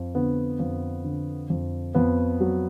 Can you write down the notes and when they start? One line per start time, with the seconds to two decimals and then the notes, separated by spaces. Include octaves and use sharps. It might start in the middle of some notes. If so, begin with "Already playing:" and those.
Already playing: F2
0.15 D3 B3
0.59 F2
1.04 D3
1.50 F2
1.95 F2 B3
2.40 F#3